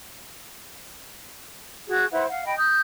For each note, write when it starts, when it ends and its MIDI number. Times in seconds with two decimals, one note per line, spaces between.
1.88 2.04 66
1.88 2.04 68
2.11 2.23 64
2.11 2.23 71
2.11 2.23 72
2.11 2.23 78
2.28 2.42 77
2.28 2.42 78
2.44 2.54 75
2.44 2.54 79
2.44 2.54 83
2.55 2.81 87
2.55 2.81 91